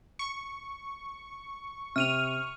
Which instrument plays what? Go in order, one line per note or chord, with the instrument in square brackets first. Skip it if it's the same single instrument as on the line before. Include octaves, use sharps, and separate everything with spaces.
[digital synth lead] C#6
[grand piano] C3 [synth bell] F6 D#7 F7